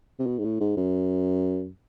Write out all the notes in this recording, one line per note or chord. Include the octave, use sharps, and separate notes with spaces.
C3
B2
G#2
A2
G#2
F#2